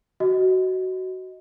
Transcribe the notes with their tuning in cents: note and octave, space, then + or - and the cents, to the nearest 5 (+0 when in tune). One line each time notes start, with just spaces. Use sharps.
F#4 +15 D#5 +15